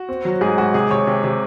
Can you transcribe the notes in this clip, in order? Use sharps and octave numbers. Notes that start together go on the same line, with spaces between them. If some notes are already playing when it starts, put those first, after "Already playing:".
Already playing: F#4
C4
F#3
G#2 G#4
G#2 F#4
C3 G#4
C3 C#5
C3
C3